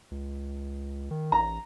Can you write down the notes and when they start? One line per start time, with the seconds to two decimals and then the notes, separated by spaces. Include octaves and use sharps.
0.11 C#2
1.11 D#3
1.32 A1 A#5